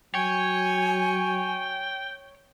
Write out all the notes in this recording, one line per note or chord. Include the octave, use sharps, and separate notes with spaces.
F#3 C#5 G5 G#5